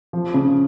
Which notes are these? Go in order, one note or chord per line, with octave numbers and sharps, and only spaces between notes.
F3
C#3